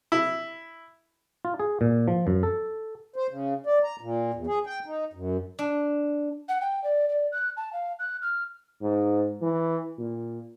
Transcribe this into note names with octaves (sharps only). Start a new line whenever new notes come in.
E4
F4
G#4
A#2
F3
F#2
A4
C5
C#3
D5
A#5
A#2
E2
G#4
G5
D#4
F#2
D4
F#5
G5
D5
D5
F#6
A5
F5
F#6
F6
G#2
E3
A#2